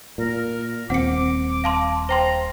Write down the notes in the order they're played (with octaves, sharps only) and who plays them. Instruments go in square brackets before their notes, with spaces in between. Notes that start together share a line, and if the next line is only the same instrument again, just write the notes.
[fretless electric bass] A#2 [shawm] A#4
[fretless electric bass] D#1 C4 [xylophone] F#5 C#7 [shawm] D6
[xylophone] F5 A5 C6
[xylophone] C5 G5 C6 [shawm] A#5